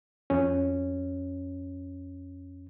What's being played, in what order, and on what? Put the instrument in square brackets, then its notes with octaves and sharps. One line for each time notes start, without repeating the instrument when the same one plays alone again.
[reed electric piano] F2 C#4